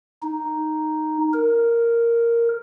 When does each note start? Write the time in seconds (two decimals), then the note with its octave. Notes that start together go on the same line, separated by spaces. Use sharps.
0.22 D#4
1.33 A#4